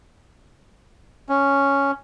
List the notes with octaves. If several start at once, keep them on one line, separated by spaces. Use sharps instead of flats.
C#4